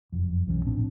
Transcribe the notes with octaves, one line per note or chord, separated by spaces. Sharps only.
F#1 F2
B1 E3 F3 C#4
A1 A#2 C4 D4